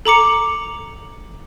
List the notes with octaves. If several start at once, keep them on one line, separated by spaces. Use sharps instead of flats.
A4 A#5 D6 C#7